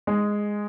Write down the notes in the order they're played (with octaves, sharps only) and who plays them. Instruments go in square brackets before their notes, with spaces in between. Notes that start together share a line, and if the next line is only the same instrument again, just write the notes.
[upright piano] G#3